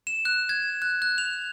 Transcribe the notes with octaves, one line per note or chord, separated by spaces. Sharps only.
E7
F#6
G#6
F#6
F#6
F7